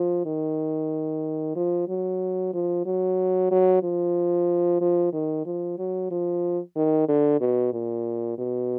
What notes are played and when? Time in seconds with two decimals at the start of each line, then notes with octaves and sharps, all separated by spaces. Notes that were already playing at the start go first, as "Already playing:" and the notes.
Already playing: F3
0.25 D#3
1.56 F3
1.88 F#3
2.54 F3
2.86 F#3
3.51 F#3
3.83 F3
4.81 F3
5.13 D#3
5.46 F3
5.78 F#3
6.11 F3
6.76 D#3
7.09 D3
7.41 B2
7.73 A#2
8.38 B2